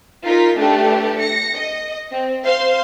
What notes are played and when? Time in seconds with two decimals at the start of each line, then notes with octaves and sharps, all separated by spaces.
0.24 D#4 F4 A#4 B6
0.58 A3 D4 G4 B4
1.19 A#6 C#7
1.55 D#5
2.11 C4
2.45 C5 F5 C6